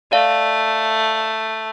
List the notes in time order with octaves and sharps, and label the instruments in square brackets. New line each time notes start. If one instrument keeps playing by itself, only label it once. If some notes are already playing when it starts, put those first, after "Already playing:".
[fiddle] A3 [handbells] D5 F5